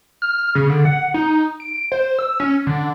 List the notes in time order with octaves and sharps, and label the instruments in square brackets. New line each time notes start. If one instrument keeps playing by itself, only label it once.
[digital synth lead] F6
C#3
D3
F#5
D#4
D7
C5
E6
C#4
D3